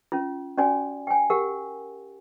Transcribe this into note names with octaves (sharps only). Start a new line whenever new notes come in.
C#4 F4
C#4 F#4 D5 G#5
G5 G#5
G4 A#4 F#5